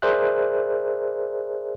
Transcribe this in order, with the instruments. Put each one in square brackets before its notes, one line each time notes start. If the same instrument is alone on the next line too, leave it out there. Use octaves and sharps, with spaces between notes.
[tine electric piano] G#4 A#4 C5 D5 E5 F#6